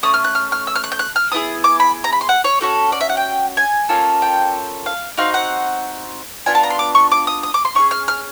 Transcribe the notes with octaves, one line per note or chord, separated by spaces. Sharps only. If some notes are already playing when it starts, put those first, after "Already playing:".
A3 C#4 D#6
F6
F#6
F6
F6
E6
F6
F#6
G6
F#6
F6
B3 E4 G#4 D#6
D6
B5
A#5
B5
C6
F#5
C#5
C#4 F#4 A4
D5
E5
F#5
G5
G#5
A#3 C#4 F4 A4
G5
F5
C4 D#4 F#4 F5
F#5
B3 D4 F4 G#5
A5
A#5
C6
D6
C#6
D6
D#6
D#6
D6
C6
C#4 F4 G#4 C#6
F6
F6